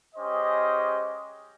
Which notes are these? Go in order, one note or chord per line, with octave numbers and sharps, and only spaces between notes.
G#3 C#4 G4 C5 D#5